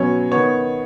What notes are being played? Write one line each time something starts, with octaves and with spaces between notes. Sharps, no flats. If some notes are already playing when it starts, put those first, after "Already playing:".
Already playing: B2 F#3 C#4 C#5
D#3 B3 C#5